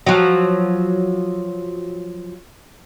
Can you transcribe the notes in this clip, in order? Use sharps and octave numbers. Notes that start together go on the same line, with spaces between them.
F3 F#3